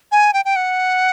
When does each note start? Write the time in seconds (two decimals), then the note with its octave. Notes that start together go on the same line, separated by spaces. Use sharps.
0.12 G#5
0.33 G5
0.45 G5
0.56 F#5